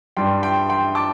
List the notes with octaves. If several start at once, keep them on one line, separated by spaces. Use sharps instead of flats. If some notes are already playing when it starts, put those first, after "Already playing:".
G2 G3 G5 C6
G5 C6
G5 C6
A5 D6